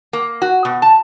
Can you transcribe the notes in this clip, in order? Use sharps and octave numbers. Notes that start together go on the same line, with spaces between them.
A#3
F#4
B2
A5